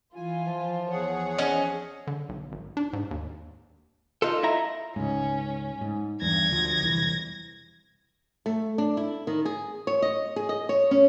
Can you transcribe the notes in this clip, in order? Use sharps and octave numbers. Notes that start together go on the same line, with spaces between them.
E3 F4 G#5
F3
E2 G#4 C#5 F#5
F3 C#4 D#5
D3
B1
G#1
D4
G#2
D#2
D#4 F4 A4
E4 E5 A#5
C#2 G#2 C#4
G#2
E2 G2 G#6 A#6
D2 D3 F3
E1 C2 E3
A3
D4
E4
D#3
G#4
C#5
D#5
G#4
D#5
C#5
C#4